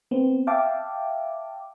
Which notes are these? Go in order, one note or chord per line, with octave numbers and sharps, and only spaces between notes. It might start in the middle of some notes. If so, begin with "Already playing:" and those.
B3 C4
E5 F5 G5 A5 D6